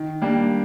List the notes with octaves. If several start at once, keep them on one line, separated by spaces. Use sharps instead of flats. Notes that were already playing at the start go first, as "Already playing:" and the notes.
Already playing: D#3
G3 A#3 D4